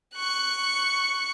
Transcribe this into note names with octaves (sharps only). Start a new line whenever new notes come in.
C#6 F#6